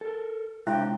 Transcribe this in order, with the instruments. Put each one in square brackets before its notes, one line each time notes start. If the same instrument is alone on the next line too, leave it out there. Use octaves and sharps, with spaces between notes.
[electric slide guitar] A4 A#4
[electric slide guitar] C3 D4 [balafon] G#3 [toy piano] E4 F4 E5 [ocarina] G5